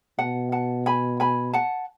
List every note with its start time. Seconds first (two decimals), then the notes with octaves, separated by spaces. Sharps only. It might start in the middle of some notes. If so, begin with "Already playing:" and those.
0.18 B2 F#5 A5
0.52 F#5 A5
0.86 G#5 B5
1.20 G#5 B5
1.53 F#5 A5